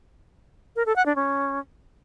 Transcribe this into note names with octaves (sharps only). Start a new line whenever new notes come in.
A#4
A4
F#5
D4
C#4